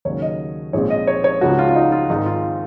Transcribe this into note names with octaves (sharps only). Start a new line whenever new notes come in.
D#2 C#3 F#3 C#5
D#5
A#1 A#2 G#3 C4 C#5
D#5
C#5
C#5
C#2 C#3 F3 F#4
F4
F4
D#4
F4
G#1 G#2 D#3 D#4
F4